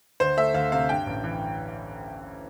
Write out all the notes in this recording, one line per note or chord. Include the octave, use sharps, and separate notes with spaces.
D2 C5
A3 E5
D2 F5
C3 F5
G2 G5
A1
E3